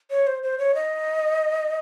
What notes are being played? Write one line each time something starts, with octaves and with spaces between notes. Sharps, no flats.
C#5
C5
C5
C#5
D#5